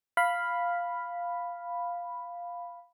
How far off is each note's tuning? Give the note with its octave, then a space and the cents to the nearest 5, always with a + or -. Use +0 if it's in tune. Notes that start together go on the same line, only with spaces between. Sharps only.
F5 +0 B5 +0